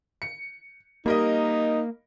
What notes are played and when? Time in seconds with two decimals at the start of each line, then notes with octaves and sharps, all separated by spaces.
0.22 C#7
1.06 G3 A#3 D#4 A#4 D#5